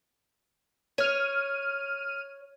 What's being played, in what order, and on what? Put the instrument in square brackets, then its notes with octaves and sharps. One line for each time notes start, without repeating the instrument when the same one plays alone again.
[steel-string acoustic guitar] C#5 [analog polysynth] F6 D#7